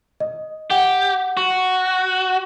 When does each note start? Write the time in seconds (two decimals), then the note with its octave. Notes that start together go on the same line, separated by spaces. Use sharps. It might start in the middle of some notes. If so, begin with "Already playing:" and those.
0.20 D#5
0.70 G4 F#5 G5
1.37 F#4